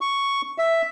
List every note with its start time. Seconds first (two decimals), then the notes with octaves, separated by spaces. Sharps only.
0.01 C#6
0.58 E5